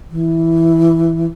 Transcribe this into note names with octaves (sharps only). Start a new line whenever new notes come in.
E3